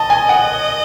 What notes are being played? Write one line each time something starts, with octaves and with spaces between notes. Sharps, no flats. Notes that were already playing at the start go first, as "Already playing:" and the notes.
Already playing: D#5 A5
G#5
F#5